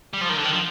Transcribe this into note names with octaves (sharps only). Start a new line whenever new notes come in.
G3
F3
D#3
D3
D#3
F3